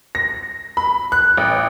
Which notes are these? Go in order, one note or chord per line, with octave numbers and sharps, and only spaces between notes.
A#6
B5
F#6
A1